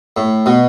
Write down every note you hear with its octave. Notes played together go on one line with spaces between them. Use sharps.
A2
B2